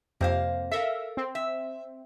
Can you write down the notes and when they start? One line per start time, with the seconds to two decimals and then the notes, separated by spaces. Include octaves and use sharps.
0.21 F2 C3 A#3 C5 F5
0.71 A4 A#4 E5 F5
1.17 C4
1.35 E5